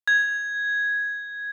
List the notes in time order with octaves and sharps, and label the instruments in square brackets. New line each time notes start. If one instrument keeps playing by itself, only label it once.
[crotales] G#6